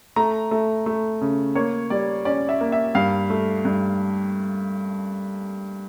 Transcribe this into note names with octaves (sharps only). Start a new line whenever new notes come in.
A3 A#5
A3
A3
C#3
A#3 C#5
G3 D5
C#4 D5
E5
A#3
E5
G2 F5
A3
G2